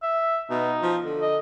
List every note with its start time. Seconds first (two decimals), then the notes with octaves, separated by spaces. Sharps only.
0.03 E5
0.50 B2 D#4
0.82 F3
1.05 D3
1.22 D#5